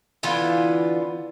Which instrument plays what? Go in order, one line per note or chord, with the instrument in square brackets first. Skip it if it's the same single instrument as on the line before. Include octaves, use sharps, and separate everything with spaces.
[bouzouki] D3 E3 B3 F4